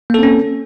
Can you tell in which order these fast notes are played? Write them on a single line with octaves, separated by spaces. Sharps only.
A#3 A4 C4 C#4